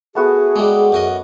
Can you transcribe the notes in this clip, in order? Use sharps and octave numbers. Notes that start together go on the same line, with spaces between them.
A3 B3 F#4 G#4
G3 G#3 D6
F#2 F#4 D#5